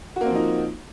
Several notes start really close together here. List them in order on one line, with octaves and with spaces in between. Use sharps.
F#4 A#3 C4 F3 D#4